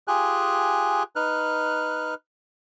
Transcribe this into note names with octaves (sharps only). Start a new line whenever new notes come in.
F4 G4 G#4 G#5 F#6
D#4 B4 F6 F#6